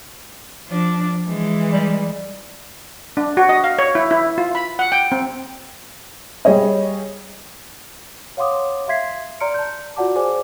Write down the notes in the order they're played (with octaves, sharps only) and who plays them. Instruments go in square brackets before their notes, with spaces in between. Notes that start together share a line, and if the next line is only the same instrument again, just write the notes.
[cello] F3 D4
E3 G#3
[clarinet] G3
[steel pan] D4
F#4
D#5
F5
C#5
E4
E4
F4
B5
F#5
G5
C4
[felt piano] G3 G#4 C#5 D#5
[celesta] C#5 F5 F#5 C6 D6 D#6
E5 F5 C6 G#6 B6 C7
D5 A#5 C6 F6 C#7 D7
A5 G6
F4 F#4 D5 F#5 A5 D6
G#4 C5 D5 G#5 D6